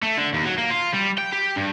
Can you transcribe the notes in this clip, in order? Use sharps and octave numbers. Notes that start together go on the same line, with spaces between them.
A3
D3
D#2
F#3
A#3
F4
G3
G5
G4
G2